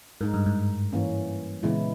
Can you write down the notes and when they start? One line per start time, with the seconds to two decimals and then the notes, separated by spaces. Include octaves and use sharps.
0.21 G#2 G#3 D#4 A#4
0.34 G2
0.46 G#2
0.93 E3 A#3 C#4
1.63 A#2 C#3 E3 G#3 B3 E4